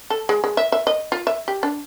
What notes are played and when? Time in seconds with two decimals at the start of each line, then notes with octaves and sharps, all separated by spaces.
0.10 A4
0.29 G#3
0.44 G#3
0.57 E5
0.72 E5
0.87 D#5
1.12 F4
1.27 E5
1.48 G4
1.63 D4